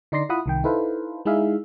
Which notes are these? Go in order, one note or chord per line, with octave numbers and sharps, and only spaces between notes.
D3 D#4 D5 C6 A#6 C7
E4 F4 F#5 B5 D#6
C2 D#3 G5
D#4 E4 A4 B4 C5 F5
G#3 D#4 E4 G#4 E5 F5